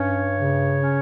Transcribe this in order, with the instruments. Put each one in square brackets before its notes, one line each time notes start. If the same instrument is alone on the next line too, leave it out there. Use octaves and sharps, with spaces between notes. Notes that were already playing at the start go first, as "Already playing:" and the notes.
Already playing: [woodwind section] G2 C#4 C#5
C#3
C#4